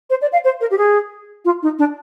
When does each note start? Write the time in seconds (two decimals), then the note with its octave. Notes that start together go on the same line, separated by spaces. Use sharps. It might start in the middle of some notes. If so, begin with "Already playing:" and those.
0.10 C5
0.22 D5
0.33 F5
0.44 C5
0.61 A#4
0.71 G4
0.78 G#4
1.45 F4
1.63 D#4
1.79 D4